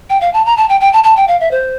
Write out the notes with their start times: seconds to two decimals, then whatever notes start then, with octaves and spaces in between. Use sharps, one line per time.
0.10 G5
0.21 F5
0.34 A5
0.46 A#5
0.57 A5
0.69 G5
0.81 G5
0.93 A5
1.04 A5
1.17 G5
1.28 F5
1.40 E5
1.51 C5